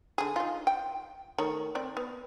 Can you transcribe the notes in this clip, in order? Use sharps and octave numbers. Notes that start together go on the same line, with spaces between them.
D3 G#4
D#4 F4
G5
D#3 A3 C#5
C4 D5
B3